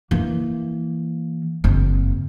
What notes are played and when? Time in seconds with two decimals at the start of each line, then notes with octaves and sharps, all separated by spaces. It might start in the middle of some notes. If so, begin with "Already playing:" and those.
0.11 E3 A#3
1.64 F#1 C4